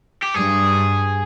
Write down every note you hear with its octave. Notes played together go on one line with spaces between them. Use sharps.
G4
G2 G#4